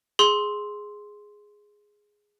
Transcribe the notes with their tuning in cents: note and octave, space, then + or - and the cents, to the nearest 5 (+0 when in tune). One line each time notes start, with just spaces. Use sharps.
G#4 +0 C6 +0 E6 -25